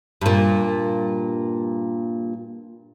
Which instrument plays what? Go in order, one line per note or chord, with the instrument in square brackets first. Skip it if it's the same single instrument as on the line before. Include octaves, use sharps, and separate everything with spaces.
[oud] G2 A#2